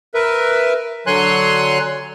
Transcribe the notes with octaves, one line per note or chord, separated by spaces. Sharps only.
A#4 B4 E5
D3 F#3 C#5 G#5 C6 F#6